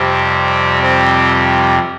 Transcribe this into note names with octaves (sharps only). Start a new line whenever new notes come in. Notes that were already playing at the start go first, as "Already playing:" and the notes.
Already playing: F2 C3 G3 C4
C4